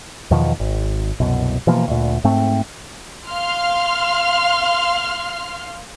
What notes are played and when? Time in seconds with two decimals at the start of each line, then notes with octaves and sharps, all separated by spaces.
0.31 E2 B2 D#3 F3
0.60 G#1
1.20 C2 F#2 B2
1.67 B2 E3 F3 A#3
1.88 D2 A#2
2.24 G#2 A3 C4
3.30 F5 C6 F6